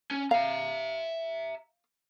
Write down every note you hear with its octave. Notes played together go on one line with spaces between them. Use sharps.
C#4
E5 F5 A#5